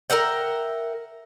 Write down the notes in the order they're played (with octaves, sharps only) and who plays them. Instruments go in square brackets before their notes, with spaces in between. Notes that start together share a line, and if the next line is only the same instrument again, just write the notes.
[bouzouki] A#4 E5 F#5 G5